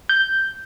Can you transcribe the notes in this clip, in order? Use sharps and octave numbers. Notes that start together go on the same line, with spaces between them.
G6